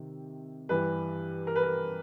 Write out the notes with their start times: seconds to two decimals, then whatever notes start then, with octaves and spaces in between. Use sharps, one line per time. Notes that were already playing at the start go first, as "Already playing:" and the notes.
Already playing: C3 D#3
0.69 G2 E3 G3 B4
1.47 A#4
1.56 B4
1.63 A#4